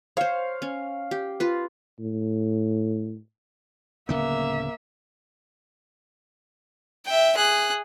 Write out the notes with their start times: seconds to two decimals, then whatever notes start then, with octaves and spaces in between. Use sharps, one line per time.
0.17 C5 C#5 F5
0.62 C#4
1.11 G4
1.40 F4 B4
2.00 A2
4.09 D1 C#3 A#3 B3 E5
7.06 E5 G5
7.36 G#4 F#6